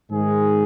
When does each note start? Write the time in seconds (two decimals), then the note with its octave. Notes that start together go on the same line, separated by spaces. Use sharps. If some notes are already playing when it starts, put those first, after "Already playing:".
0.10 G#2 D#3 G#3 G#4